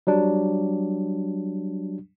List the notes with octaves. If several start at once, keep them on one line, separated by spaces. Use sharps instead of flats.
F#3 G3 D4